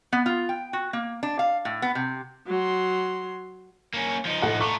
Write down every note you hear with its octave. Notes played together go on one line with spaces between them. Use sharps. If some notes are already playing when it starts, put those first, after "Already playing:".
B3
F4
G5
F#4
A#3
D4
F5
A2
B3
C3
F#3 C6
A#3 C#4
F3 D#4
A2 F#5
A3 F4 A#5 C#6 D6